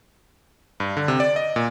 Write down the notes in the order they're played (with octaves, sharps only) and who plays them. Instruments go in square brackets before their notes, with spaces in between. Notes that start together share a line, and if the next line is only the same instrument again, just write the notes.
[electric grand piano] G2
D3
C3
D5
D#5
A#2